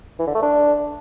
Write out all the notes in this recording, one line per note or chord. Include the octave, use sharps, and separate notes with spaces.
E3
D3
A3
D4